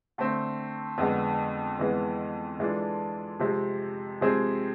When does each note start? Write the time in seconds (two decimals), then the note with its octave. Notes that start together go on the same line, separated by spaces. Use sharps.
0.18 D3 A3 C4
0.98 F2 D3 G#3 B3
1.79 F2 E3 G#3 B3
2.59 E3 G#3 D4 F4 A4
3.39 C3 F3 G#3 C4
4.21 C3 F3 G#3 C4 G#4